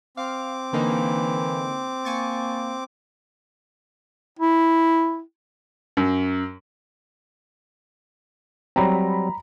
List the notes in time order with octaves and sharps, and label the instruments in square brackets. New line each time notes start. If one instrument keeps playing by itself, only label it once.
[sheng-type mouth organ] C4 D6 [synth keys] F5
[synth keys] D3 A#3 D#4 [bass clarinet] E3
[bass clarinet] A#3 [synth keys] G#5 C#6 A6
[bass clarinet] E4
[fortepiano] F#2
[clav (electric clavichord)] F#3 G3 C4 [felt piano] A#5 B5